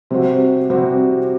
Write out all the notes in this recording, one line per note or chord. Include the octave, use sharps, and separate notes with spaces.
C3 G3 C4 F#4
C3 G3 C4 F#4